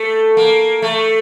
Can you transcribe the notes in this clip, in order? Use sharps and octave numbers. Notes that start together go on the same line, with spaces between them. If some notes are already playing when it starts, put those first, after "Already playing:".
Already playing: A3
A#3
A3